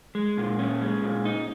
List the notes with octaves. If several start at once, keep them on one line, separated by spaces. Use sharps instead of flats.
G#3
A#2
C#4
G#3
A#2
D#4